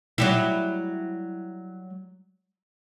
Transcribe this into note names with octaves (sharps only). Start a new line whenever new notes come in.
F#3 G3 E4